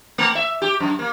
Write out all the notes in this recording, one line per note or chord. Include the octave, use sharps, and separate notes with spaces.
A3
E5
G4
F#2
A#3